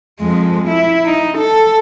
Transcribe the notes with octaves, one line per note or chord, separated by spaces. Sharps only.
F2 G#3
E4
D#4
A4